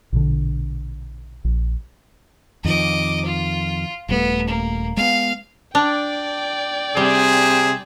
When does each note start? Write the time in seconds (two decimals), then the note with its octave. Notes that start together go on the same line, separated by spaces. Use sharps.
0.12 A#1 B2 D3
1.45 A#1
2.65 F2 D#3 F3 D#5 D6
3.25 F4
4.09 D#1 G3 A3 B3
4.48 A#3
4.97 G#3 B3 F5
5.75 D4 D5 G5
6.97 C3 G3 G#4